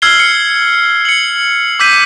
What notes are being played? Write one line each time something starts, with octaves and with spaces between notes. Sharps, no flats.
E6 F6 G#6 C7 G7
C#7
C#7 F#7
D6 E6 G6 B6 D#7